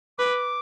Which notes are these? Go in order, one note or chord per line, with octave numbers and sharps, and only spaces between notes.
B4 D6